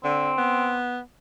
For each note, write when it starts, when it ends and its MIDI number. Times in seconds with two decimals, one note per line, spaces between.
0.04 0.32 50
0.04 0.77 60
0.38 0.99 59